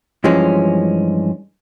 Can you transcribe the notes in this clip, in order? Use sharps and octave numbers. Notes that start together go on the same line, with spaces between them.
G2 E3 F3 G#3 C#4